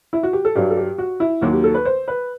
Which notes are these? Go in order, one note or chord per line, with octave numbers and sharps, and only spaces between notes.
E4
F#4
G4
A4
G2 F#3 G4
A4
G4
F#4
E4
D#2 D#3 F#3 F#4
G4
A4
B4
C5
B4